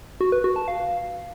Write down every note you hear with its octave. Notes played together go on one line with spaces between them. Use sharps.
F#4
B4
F#4
A5
F5